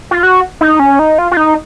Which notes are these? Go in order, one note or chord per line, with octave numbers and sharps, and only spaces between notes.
F4
F#4
D#4
C#4
D#4
F4
F4
D#4